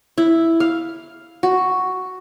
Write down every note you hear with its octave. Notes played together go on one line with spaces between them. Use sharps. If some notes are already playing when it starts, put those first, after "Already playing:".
E4
F5
F#4